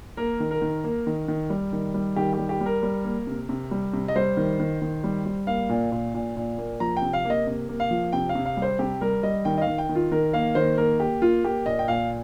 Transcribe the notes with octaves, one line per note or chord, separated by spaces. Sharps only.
A#3 A#4
D#3
A#4
D#3
A#3
D#3
D#3
G3
D#3
G3
D#3 G4
G4
G3
G4
G3
A#4
G3
A#3
C3
C3
G3
C3
D#5
G3 C5
D#3
D#3
D#3
G3
G3
A#3 F5
A#2
A#2
A#2
A#2
A#3
F3 A#5
G5
C3
F5
A#3 D#5
C3
A#3
F5
F3
C3 G5
F5
C3
F5
G3
C5
C3 G4
G3 A#4
G3 D#5
D#3 G5
D#5
F5
D#3
G5
D#3
F4
D#3 A#4
A#3 F5
D#3 C5
A#3 A#4
A#3 G4
A#3 F4
A#3 G4
A#2 D#5
G5
A#2 F5